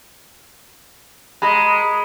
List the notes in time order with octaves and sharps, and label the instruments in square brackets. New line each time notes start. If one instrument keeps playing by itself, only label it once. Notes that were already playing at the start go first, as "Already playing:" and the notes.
[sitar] G#3 [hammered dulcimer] D#5 A#5 B5